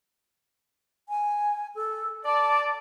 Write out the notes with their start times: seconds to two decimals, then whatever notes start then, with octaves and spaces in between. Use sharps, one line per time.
1.09 G#5
1.75 A4
2.25 D5 A5